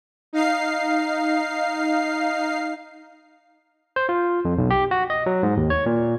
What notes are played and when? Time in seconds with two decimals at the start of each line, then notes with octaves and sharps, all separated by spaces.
0.33 D#4 F5 C7
3.96 C5
4.09 F4
4.45 F2
4.58 B1
4.71 G4
4.91 F#4
5.10 D#5
5.26 F#3
5.43 G#2
5.57 D#2
5.70 C#5
5.86 A#2